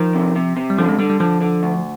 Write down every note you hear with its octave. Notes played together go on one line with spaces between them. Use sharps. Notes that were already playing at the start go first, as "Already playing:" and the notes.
Already playing: D#3 F3
C3
C3
C3
G3
D3 F3
G#3
D3 G3
G3
D3 F3
D3
D2